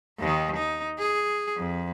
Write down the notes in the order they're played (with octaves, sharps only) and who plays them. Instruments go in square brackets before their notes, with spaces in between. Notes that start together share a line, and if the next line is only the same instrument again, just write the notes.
[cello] D#2 D#3
D#4
G#4
F2